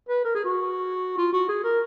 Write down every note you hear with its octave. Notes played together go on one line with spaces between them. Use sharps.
B4
A#4
G#4
F#4
F4
F#4
G#4
A#4